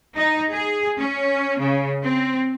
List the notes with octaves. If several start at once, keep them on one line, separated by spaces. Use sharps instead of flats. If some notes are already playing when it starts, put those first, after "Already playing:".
D#4
G#4
C#4
C#3
C4